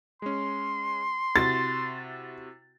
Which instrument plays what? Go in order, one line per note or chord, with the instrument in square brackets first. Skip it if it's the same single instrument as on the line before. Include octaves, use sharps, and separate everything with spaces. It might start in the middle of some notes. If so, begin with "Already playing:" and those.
[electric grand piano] G#3 C#4 [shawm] C6
[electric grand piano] C3 E4 F#4 [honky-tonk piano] A6